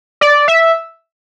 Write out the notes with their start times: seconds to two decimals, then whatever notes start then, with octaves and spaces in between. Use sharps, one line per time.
0.21 D5
0.48 E5